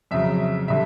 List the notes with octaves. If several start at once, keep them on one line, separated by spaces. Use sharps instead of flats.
F2 C#3 F#3 E5
D3 G3 E5